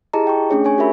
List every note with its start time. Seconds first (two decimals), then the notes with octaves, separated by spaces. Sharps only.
0.13 E4 G4 G#4 D#5 A5 A#5
0.27 G5 C#6
0.50 A3 C#4 D4 G#4 C#5
0.64 G#4 C#5 G#5 C#6
0.78 C#4 F#4 G4 A#4 E5 B5